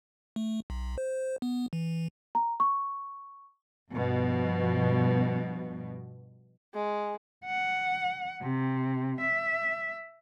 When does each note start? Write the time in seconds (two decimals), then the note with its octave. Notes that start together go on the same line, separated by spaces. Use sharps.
0.36 A3
0.70 B1
0.98 C5
1.42 B3
1.73 E3
2.35 A#5
2.60 C#6
3.90 G2 B2 F3
6.74 G#3
7.45 F#5
8.42 C3
9.20 E5